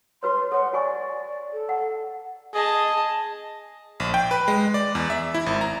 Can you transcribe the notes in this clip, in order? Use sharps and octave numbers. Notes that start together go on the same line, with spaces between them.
F#4 B4 C#5 C6
A4 C#5 F#5
F#4 D5 G#5 C#6
A4
F#5
G#4 D#5 A5
A#1
G5
B4
G#3
D5
E2
E5
E4
G#1
A#5